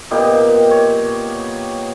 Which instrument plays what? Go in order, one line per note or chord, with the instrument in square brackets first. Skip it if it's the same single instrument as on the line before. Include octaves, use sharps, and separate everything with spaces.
[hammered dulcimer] A#2 B3 D#4 G4
C#5